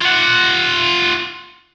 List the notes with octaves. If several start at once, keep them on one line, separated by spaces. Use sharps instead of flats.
F4 F#5